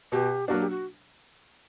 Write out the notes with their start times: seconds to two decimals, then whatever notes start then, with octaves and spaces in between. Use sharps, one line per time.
0.12 B2 G4
0.48 F#3 A#3 D4 F#4
0.60 G4
0.70 F#4